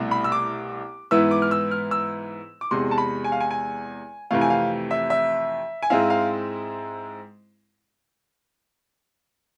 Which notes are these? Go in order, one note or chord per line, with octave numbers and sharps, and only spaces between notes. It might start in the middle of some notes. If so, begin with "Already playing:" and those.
Already playing: C2 B2 A3 E4
B5
E6
D6
G#2 E3 B3 E4 E6
D6
F6
E6
F6
E6
D6
E2 C3 G#3 C6
A5
B5
G#5
F5
G#5
G#5
F2 C3 E3 A3 F5
G#5
F5
E5
E5
G#5
G#2 G#3 C4 E4 F5
F5